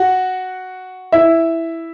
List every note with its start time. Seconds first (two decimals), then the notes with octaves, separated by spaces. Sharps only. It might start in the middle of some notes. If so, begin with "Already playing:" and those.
Already playing: F#4 F#5
1.12 E4 E5